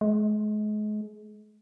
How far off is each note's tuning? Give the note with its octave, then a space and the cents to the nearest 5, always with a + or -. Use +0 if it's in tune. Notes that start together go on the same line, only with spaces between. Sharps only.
G#3 +35